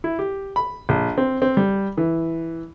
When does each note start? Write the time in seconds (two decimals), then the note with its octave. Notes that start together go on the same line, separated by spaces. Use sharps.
0.04 E4
0.19 G4
0.56 B5
0.89 A#1
1.18 C4
1.42 C4
1.57 G3
1.97 E3